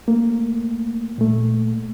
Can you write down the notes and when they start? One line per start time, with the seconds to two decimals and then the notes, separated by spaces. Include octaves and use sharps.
0.08 A3 A#3
1.18 A#2 A3